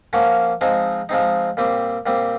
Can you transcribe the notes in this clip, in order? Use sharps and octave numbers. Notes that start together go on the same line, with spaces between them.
F3 A#3 C#4 F#4
F3 G#3 C4 D#4
F3 G#3 C4 D#4
A#2 G3 C4
A#2 G3 C4